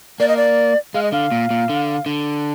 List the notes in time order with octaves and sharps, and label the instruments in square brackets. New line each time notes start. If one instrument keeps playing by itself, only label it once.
[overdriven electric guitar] A#3 [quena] D5
[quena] D#5
D5
[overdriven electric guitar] G#3 [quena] F5
[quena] D#5
[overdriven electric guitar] D3 [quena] F5
[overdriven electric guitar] A#2
A#2
D3
D3